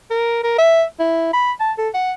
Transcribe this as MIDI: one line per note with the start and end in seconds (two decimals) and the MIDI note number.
0.11 0.41 70
0.43 0.57 70
0.58 0.84 76
1.00 1.31 64
1.33 1.52 83
1.60 1.72 81
1.78 1.89 69
1.94 2.12 78